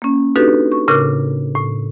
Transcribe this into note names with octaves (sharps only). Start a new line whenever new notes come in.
A#3 C#4
D4 D#4 F#4 G4 A4 B4
C#6
A2 C#3 A#4 D6 F6 F#6
A2